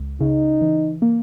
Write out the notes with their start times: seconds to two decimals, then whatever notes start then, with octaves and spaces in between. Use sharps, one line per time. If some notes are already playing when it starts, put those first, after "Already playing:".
Already playing: C#2
0.21 C#3 D#4
0.62 E3
1.02 A#3